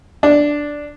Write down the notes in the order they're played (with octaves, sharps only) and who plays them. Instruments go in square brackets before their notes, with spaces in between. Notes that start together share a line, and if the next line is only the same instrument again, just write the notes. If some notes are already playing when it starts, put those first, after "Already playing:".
[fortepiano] D4